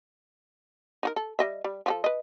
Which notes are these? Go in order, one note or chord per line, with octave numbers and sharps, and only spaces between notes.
D#4 F#4 A#4
A4
G3 D#5 E5
G3
F3 F#4 A4
B4 D#5